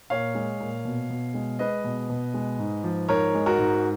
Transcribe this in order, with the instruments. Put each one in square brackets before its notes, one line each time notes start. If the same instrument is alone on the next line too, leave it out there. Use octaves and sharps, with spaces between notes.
[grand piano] A#2 C#5 F5
G#3
A#2
B2
B2
G#3
G#3 B4 D#5
B2
B2
G#3
G#2
F3
G#2 A#4 C#5
G#3
F#4 A#4
G#2